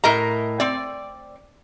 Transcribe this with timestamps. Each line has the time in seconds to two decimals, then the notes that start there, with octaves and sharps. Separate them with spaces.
0.04 A2 A#4 D#5 A#5
0.60 C4 D5